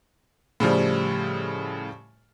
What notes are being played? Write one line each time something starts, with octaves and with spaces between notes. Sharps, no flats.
A2 C#3 F3 G3